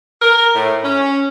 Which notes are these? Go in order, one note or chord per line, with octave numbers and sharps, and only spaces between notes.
A#4
A2
C#4